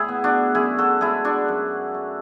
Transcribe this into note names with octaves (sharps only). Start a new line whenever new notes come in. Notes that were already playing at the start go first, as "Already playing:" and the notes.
Already playing: A2 E4 G#4
B3
D4 F#4
F#2 E4 G#4
F#4 A4
G#3 E4 G#4
D4 F#4
F#2
A3